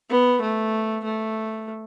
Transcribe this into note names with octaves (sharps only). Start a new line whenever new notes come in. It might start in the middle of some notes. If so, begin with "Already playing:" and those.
B3
A3
A3